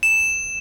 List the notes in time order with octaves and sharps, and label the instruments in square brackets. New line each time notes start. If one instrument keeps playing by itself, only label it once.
[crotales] E7